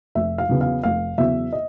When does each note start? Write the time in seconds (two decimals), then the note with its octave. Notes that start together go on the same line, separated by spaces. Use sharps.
0.15 F1 E5
0.38 F5
0.49 E2 C#3 F#3 B3
0.61 F5
0.83 F1 F5
1.18 E2 C#3 F#3 B3 E5
1.53 D#5